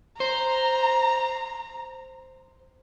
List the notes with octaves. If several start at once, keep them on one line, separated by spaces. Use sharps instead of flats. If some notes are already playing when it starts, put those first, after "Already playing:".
C5 A#5